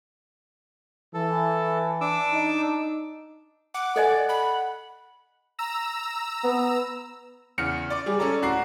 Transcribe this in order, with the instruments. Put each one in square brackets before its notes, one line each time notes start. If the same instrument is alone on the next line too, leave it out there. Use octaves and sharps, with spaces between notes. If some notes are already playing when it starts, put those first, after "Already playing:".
[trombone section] E3 [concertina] A4
[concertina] D4 D6 E6
[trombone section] D#4
[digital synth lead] F#5 [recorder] D6
[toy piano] A4 D#5 G#5 [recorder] D5
[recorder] B5
[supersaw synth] A#5 E6
[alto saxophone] B3
[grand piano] E2 C#3 F6 C#7
D5 D6
G3 G#4
C#4 A4 D5 A#5
D1 F#4 A#5 D6 C7